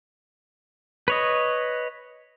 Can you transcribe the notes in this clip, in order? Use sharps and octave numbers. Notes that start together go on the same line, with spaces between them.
B4 C#5 D#5